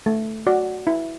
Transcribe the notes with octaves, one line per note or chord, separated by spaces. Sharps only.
A3
F#4 D5
E4